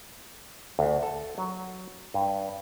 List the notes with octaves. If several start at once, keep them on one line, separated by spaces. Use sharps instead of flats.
D2
A4
F#3
G2